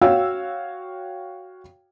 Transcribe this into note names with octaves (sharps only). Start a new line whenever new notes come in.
F#4 C#5 F5 G5 E6